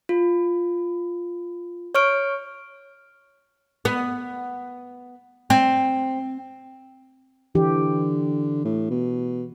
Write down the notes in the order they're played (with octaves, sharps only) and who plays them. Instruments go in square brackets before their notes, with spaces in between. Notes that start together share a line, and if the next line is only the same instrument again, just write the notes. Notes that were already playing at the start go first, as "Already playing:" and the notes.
[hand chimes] F4
C#5 C#6 F6 D7
[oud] B3
C4
[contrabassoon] D3 [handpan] E3 G4
[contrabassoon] A2
B2